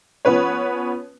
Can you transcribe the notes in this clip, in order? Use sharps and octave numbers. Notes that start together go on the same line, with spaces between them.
F3 B3 C#4 B4 C#5